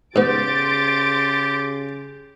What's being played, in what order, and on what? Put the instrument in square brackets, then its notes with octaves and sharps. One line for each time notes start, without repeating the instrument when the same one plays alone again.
[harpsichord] G#2 B3 [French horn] C#3 [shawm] G4 [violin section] C6 A6 D7